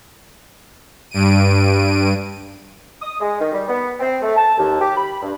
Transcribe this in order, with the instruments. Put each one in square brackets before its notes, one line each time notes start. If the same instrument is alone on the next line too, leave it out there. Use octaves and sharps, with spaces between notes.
[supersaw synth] G2 D7 D#7
[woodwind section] D#6
G#3
D#3
G3
B3
C4
A3
A5
D#2
G4
B5
G2